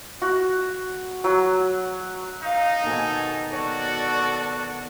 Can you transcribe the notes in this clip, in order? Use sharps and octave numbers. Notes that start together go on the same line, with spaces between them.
F#4
F#3
D#4 F5
B2 D#3 A4 G#5
F#4 A4 C#5 D5